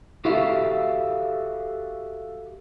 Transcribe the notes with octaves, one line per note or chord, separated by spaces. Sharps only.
F#4 G4 A4 E5 F5